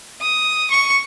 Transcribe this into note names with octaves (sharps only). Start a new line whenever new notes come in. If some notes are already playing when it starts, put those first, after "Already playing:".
D#6
C#6